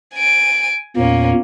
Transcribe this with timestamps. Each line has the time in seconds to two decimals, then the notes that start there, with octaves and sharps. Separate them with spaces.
0.15 G#5 D7
0.97 E2 A#2 A#3 C#4